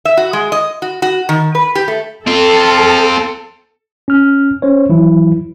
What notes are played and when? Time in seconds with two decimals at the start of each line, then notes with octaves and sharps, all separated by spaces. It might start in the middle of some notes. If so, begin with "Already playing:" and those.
0.05 E5
0.17 F#4
0.33 G#3
0.52 D#5
0.82 F#4
1.02 F#4
1.29 D#3
1.55 B4
1.75 G4
1.88 A3
2.27 C4 F4 A4
4.08 C#4 F6
4.62 C#4 C5 C#5
4.89 E3 F#3 E4